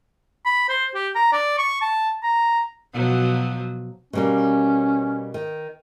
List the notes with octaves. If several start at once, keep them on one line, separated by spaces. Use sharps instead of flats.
B5
C5
G4
A#5
D5
C#6
A5
A#5
B2 F3 F#3
B2 G3 A#3 C#4
D#3